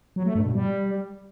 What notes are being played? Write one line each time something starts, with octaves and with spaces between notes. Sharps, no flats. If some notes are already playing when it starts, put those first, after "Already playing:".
F#3
A3
G2
B2
G3